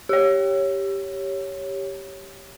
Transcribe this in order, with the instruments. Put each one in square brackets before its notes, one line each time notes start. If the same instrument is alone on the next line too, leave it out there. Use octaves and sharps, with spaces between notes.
[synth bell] G4 C#5